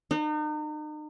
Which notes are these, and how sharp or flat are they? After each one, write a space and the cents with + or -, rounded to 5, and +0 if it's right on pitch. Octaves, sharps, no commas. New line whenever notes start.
D#4 -40